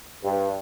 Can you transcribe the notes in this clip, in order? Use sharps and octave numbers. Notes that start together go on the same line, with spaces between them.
G2